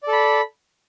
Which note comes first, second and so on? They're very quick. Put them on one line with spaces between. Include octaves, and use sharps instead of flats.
D5 A4 B5